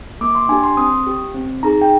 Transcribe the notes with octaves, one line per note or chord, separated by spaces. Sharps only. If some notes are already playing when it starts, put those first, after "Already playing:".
A#3 D6
C6
D4 G4 G#5
C6
C4 D#6
G4
C4
D#4 G#4 A#5
G5